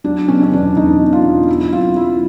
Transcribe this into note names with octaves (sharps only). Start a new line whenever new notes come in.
F#3 D4
B2 C#4
C#4
E2 D4
E2 D#4
B2
F4
B2
F#3 E4
E4
C4 F4
F#3 E4